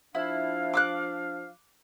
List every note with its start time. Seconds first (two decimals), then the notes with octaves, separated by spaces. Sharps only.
0.15 F3 D4 E4 F5
0.73 D6 E6 F#6